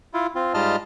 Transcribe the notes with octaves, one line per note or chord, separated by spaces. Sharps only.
E4 F4
C4 F4
G#2 G3 F4 D#5 A5 F6